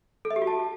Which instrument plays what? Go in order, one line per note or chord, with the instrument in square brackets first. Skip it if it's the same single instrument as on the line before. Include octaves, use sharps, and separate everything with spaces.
[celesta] A4
E5
G4
F#4
A5